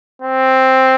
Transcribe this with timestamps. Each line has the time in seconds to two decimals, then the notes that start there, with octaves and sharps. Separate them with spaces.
0.22 C4